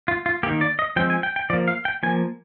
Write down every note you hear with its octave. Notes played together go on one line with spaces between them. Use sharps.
F4
F4
D#3 A#3 G4
D5
D#5
F3 G#3 C4 G5
G#5
G5
G5
F3 A#3 D5
F5
G5
F3 A#3 G#5